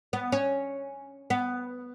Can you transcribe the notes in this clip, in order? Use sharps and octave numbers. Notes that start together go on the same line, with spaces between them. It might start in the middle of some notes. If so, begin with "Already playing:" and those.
B3
C#4
B3